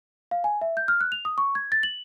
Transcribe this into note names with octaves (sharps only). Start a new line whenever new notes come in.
F5
G#5
E5
G6
F6
F#6
F7
D#6
C#6
G#6
A6
F#7